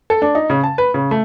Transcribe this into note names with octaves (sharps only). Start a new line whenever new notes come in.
A4
D4
D#4
C#3
A5
B4
C#3
A3